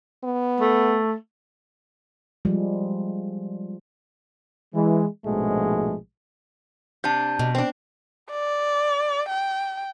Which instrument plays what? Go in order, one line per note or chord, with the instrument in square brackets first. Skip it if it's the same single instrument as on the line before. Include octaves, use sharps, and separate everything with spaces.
[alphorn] B3
[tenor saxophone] A3
[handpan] F3 G3 G#3
[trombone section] E3 G#3
A#1 G#2 B2 F3 G#3 A3
[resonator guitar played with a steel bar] C3 D4 [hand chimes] A5 G6
[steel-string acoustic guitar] B2
[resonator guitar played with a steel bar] C4 D4
[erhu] D5
G5